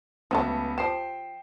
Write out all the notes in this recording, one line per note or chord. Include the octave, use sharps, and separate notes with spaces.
C#2 F3 F#3 A3 B3 A5
F3 G4 G5 C7 E7